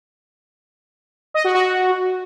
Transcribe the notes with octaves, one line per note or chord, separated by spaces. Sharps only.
D#5
F#4
F#4